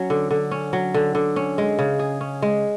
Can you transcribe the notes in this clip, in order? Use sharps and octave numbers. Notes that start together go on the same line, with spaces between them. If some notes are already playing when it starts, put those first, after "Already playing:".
Already playing: F#3 C#4
D3
D3
C#4
F#3
D3
D3
C#4
G#3
C#3
G#4
C#4
G#3